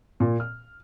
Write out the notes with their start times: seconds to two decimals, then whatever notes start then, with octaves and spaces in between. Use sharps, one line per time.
0.20 A#2
0.40 F6